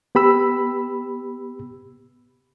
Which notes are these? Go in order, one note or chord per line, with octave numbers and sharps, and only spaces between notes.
B3 G4 B5 E6